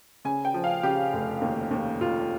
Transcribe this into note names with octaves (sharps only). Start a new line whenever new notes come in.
C#3 G#5
G5
F3
F5
C#3 G4
F1
D#2
D#2
F1 F4